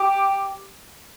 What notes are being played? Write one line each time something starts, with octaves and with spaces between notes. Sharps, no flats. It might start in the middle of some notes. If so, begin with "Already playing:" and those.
Already playing: G4